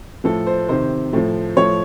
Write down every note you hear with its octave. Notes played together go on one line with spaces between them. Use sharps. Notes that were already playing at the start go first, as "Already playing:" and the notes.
A2 F3 A4
C5
C3 D#3 C5
A2 F3
A2 F3 C#5